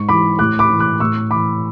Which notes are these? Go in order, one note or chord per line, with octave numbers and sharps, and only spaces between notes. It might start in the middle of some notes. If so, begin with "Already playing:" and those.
Already playing: G#2 C#6
E3 B5 D6
A2 D6 F#6
B5 D6
E3
D6 F#6
A2 C#6 E6
E3 B5 D6